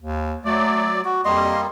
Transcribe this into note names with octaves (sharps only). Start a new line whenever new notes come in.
D#2
F#3 A3 D5
F#4
F2 G3 A#3 D#5 C6